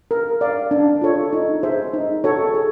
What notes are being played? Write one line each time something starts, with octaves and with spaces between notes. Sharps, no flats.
A#4
D5 F5
D4
F4 A4 C#5
D#4
G#4 C5 E5
D#4
F#4 A4 C#5
G#4